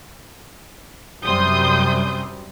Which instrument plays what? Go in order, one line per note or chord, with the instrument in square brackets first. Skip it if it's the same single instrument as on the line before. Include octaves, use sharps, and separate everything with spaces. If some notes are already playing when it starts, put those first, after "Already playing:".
[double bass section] F#2 C3 G3 [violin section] C6 D#6 G6